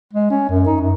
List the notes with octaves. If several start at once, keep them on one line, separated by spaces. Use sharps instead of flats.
G#3
C#4
F#2
D#4
F#2